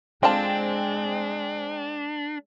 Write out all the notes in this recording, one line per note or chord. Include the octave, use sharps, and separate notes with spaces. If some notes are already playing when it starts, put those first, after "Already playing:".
D3 G#3 C4 D4 F4 A5